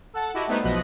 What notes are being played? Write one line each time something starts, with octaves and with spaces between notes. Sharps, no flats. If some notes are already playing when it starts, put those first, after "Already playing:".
A4 F#5 A5
E4 F#4 G4 D#5 E5
G3 A3 B3 D#4 B4 C5
B1 B2 F3 D#5 B5 F#6